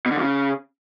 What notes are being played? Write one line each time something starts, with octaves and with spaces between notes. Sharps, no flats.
B2
D3
F2
C#3